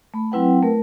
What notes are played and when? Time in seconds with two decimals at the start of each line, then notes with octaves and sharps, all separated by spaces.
0.14 A3 B5
0.32 F#3 C4 E4 B4 F#5 G5
0.62 A3 A#4